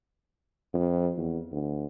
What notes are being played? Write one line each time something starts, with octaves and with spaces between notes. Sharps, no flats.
F2
E2
D2